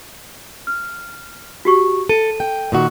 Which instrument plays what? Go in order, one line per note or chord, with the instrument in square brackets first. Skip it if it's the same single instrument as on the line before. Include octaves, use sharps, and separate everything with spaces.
[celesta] F6
F#4 G4 C#6
[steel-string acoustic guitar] A4 [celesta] D#7
[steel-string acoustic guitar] G5
A#2 D#3 F#4